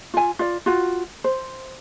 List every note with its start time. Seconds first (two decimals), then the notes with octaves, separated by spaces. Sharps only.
0.14 F4 G#5
0.39 F4 D5
0.66 F4 F#4
1.24 C5